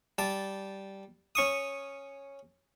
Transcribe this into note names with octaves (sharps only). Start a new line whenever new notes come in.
G3 A5
C#4 C#6 D#6